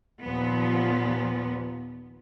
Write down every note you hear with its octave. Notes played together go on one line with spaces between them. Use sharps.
D#2 A#2 F3 B3